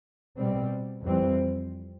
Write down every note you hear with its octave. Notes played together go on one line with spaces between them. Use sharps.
B2 G3 C4
F2 E3 G3 C4